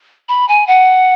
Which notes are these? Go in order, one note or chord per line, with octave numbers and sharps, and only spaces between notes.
B5
G#5
F#5